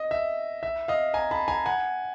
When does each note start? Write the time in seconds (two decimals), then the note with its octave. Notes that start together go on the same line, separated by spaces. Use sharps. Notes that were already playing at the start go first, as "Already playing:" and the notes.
Already playing: D#5
0.11 E5
0.63 E5
0.88 D#5 F5
1.14 G#5 A#5
1.31 A5 B5
1.48 G#5 A#5
1.66 F#5 G#5